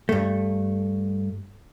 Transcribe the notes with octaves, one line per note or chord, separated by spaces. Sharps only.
G2 A3